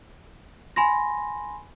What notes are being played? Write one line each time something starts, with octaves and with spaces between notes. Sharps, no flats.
G#5 B5 C6 A#6